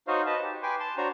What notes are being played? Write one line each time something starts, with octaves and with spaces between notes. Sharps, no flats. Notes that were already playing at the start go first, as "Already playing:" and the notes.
D#4 F#4 C5 C#5 D#5 F5
B4 D#5 A5
G4
B4 G5 G#5 C6 D6
A5 C6
D4 F#4 C5 C#5 A#5